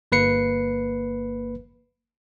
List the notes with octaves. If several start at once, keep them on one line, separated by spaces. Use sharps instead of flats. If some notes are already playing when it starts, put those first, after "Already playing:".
G1 A#3 B4 C7 C#7